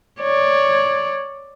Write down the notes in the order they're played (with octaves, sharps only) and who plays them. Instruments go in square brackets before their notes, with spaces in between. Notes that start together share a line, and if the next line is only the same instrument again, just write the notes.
[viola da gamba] C#5 D5